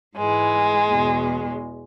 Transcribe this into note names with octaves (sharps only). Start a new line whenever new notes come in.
G#2 E3 G#3
E2 B2